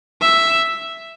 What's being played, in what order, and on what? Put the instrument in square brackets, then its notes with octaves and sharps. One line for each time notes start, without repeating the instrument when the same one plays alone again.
[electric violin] E5